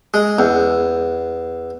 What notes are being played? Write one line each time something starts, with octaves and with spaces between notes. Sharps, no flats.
G#3
E2